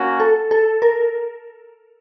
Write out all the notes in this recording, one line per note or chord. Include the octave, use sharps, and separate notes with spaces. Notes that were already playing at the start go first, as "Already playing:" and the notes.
Already playing: A#3 C#4 F#4
A4
A4
A#4